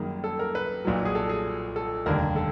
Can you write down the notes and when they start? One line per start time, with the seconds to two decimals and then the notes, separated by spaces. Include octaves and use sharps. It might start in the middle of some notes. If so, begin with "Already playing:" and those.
Already playing: F#2 D#3 G3 A#3 G#4
0.24 A4
0.39 A#4
0.55 B4
0.85 B1 A#2 F#3
1.05 G#4
1.15 A4
1.29 G#4
1.76 A4
2.06 F1 D#2 D3 G3 A#4
2.36 A4